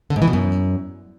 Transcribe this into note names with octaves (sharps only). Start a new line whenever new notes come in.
D3
G#2
E3
B2
F#2